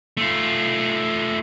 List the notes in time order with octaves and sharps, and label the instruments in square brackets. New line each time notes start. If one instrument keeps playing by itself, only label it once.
[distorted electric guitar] A3 F4